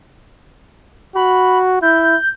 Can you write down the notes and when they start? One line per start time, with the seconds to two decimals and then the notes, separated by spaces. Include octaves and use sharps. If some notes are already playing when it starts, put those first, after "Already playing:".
1.15 F#4 B5
1.82 E4 G6